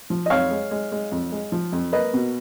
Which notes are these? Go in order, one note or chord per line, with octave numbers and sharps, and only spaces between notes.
F3
D#5
F2 C#5 F5
G#3
G#3
G#3
F2
G#3
F3
F2
A#3 B4 D#5
B2